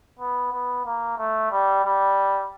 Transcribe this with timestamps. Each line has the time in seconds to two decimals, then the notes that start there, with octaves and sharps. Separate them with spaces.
0.20 B3
0.53 B3
0.86 A#3
1.18 A3
1.52 G3
1.85 G3